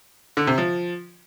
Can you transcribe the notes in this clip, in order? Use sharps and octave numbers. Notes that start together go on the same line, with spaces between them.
D3
C3
F3